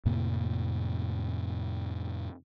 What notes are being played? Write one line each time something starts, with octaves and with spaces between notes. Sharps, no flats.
F2 A2 C3 A#3